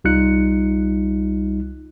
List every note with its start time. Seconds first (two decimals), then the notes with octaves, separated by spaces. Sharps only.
0.04 C2 G3 D#4 F4 F#6 C#7